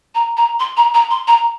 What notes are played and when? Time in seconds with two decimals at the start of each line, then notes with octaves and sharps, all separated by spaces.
0.15 A#5
0.37 A#5
0.60 C6
0.77 A#5
0.94 A#5
1.11 C6
1.28 A#5